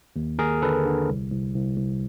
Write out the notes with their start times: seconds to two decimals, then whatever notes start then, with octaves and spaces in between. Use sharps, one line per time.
0.16 D#2
0.39 D#2 G#4 A#4
0.62 D3 A4 B4
0.85 D3
1.09 C2
1.32 C2
1.55 C2
1.78 C2